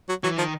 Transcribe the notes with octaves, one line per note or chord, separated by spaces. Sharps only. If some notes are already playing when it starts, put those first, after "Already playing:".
F#3
E3 F#3
D#3 F3